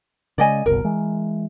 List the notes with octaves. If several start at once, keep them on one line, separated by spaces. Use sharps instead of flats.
C#3 G#3 D5 D#5 G#5
F#1 C2 B2 A#4
E3 G#3